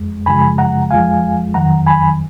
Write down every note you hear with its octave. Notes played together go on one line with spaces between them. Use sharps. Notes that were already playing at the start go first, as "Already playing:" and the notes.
Already playing: F2 G#3
F#2 C#3 F3 G#3 G#5 B5
F#5 A#5
F2 F3 G#3 F5 G#5
F2 D#3 F#3 F#5 A#5
G#5 B5